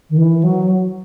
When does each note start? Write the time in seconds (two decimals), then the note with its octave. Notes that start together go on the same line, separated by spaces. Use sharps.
0.10 D#3
0.17 E3
0.43 F#3